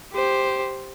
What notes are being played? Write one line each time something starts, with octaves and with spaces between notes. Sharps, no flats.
G4 C5